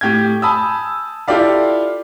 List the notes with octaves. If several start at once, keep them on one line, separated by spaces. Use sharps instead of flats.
A2 G4 G6 G#6
G#5 A5 B5 D#6 E6
E4 F4 G4 A4 D5 F5